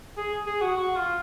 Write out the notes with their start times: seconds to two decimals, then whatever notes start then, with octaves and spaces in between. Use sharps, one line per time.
0.17 G#4
0.46 G#4
0.61 F#4
0.76 F#4
0.96 F4